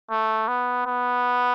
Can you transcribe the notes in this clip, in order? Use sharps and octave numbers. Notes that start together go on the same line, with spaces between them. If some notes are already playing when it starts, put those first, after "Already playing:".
A3
B3
B3